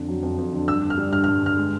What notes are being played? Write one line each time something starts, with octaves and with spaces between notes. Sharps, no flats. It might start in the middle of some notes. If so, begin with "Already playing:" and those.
Already playing: F2 D3
F#3
F2
F2
D3
G2 E6
D3
F6
G3
G2 F6
F6
G2
D3 F6
G#3